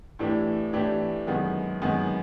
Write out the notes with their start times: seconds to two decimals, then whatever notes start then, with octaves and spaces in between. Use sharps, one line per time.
0.19 A2 E3 A3 D4 G4
0.73 A2 E3 A3 D4 G4
1.27 F#2 D#3 G#3 B3
1.82 F#2 D#3 G#3 B3